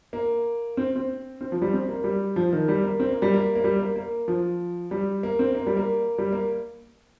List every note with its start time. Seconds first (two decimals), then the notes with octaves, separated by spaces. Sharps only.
0.13 A#3
0.77 C4
0.96 C4
1.41 C4
1.52 F3
1.62 G3
1.73 C4
1.89 A#3
2.04 G3
2.36 F3
2.53 D#3
2.68 G3
2.84 A#3
3.00 C4
3.11 A#3
3.22 G3
3.34 A#3
3.56 A#3
3.64 G3
3.79 A#3
3.96 A#3
4.28 F3
4.91 G3
5.23 A#3
5.39 C4
5.55 A#3
5.67 G3
5.77 A#3
6.18 G3
6.32 A#3